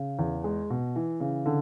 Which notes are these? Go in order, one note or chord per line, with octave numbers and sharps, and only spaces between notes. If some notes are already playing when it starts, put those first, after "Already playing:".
Already playing: C#3
E2
G#3
B2
E3
C#3
D3